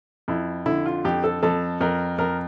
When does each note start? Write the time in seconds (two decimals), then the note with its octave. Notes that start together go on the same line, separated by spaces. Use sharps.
0.28 F2 E4
0.66 D3 E4
0.86 F4
1.05 F2 G4
1.24 A4
1.43 F2 A4
1.81 F2 A#4
2.18 F2 A#4